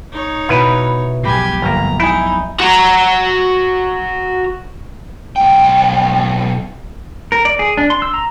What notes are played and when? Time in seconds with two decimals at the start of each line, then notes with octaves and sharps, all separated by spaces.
0.12 D#4 C#5
0.49 B2 E4 B4
1.23 B1 F2 G#2 G4 G#5 B5 C7
1.62 G1 A#3 A#5
2.00 D#4 E4 D#5 G#5 G6
2.60 F#4 A#5
5.36 B1 G5
7.32 A#4
7.45 D5
7.59 G#4
7.77 D4
7.90 C6
8.02 E6
8.14 A#5